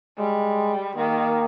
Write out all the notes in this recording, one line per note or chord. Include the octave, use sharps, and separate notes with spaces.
G3 G#3
D#3 A#3